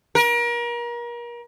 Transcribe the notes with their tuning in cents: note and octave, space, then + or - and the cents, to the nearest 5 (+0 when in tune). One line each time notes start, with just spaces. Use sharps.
A#4 +35